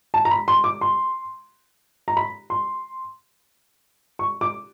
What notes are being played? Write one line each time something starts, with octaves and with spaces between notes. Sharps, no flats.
A5
A#5
B5
C6
D6
C6
A#5
B5
C6
C#6
D6